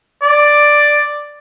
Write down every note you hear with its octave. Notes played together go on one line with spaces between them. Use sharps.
D5